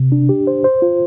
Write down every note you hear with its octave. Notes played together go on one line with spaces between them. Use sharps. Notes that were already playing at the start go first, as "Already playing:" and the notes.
Already playing: C3
D4
G4
C5
C5
F4